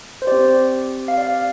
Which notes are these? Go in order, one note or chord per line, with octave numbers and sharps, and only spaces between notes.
C5
C4 G4 D5
F5
D5
F5